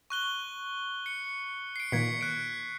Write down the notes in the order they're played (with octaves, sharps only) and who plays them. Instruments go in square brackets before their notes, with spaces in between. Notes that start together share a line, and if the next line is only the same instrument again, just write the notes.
[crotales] C#6 F#6 G7
C#7
C7 D7
[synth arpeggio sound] A#2 D#3 [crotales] G#6 B6 C#7
[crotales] F#6 D7